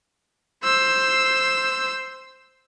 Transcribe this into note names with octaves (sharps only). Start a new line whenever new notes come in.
C5 E6